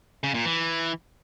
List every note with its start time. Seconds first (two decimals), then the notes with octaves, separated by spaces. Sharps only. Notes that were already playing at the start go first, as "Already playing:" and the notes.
0.24 C#3
0.34 A#2
0.45 E3